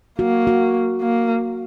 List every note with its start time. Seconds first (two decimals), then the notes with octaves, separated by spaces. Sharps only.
0.19 A#3 F#4
0.47 F#4
1.02 A#3